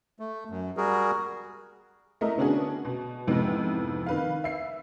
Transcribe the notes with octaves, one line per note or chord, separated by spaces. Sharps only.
A3
F#2
G3 F#4 G#4 A#4
A3 E4 A#4 D#5
D3 B3 C#4 D4 F#4 G#4
B2
F2 G#2 C3 E3 G#3 B3
D#3 B4 F5
E5 C7